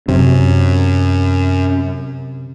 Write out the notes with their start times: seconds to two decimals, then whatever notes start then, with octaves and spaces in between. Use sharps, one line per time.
0.08 F#2 C3